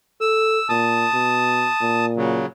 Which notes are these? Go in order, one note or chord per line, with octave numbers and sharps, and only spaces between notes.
A4 E6
A#2 A5 D#6
B2
A#2
C#3 F#3